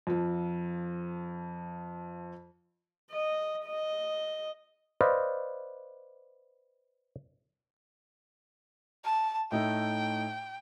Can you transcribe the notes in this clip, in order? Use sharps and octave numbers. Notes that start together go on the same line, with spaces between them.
F2 F3
D#5
D#5
B4 C5 D5 D#5 F5
A5
A2 A3 D#4 G5